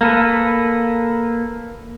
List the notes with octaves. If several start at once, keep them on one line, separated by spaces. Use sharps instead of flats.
A#3 A4 B4